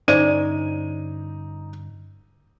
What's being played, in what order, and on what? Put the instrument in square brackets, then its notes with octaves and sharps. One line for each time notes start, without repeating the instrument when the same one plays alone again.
[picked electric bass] G2 D3 C#4 [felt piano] D#4 D#7 [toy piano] C5 D5 D6